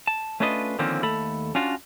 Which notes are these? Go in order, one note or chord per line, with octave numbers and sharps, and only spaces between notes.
A5
A3 C#4 D4 F4 B4 D#5
D3 D#3 F3 A#3 C4 C#4
D#2 A3 A4 B5
C#4 D4 F4 F#4